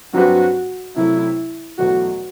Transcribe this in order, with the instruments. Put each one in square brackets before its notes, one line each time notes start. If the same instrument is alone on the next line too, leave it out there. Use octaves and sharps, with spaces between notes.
[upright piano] G2 F#3 C4 G4 B4 [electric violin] F#4
[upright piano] C3 F#3 A3 [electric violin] E4
[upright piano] E2 B2 F#3 A3 [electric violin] F#4